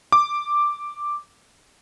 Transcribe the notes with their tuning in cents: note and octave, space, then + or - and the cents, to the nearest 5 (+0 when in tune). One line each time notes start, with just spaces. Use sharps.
D6 +0